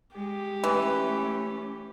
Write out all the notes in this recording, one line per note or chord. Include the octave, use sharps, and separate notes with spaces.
G#3 G4
E3 A3 C#4